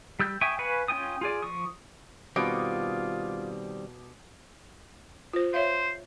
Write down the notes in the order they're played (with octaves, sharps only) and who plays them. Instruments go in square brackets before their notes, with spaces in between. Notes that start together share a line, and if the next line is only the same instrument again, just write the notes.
[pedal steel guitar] G3 E6 G6
E5 G5 G#5 C#6 D#6
B4 F5 G#5 B5 C#6
C#4 F4 G5 G#5 D#6
F4 G#4 D5
F3 C#6 D#6
[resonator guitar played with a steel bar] B2 [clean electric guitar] D#3 G3 C4 [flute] F4 [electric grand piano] D6 D#6 D7
[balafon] F4 C5
[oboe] C5 [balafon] C#5 E5 F5